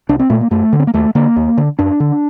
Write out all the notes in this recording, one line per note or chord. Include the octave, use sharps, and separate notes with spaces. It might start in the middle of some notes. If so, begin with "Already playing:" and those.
C2 D4
C4
A#2 A3
A#3
F#2 A3
D3
C4
A#3
D#2 A3
D3 A#3
D#2
D3
F#2 D4
D3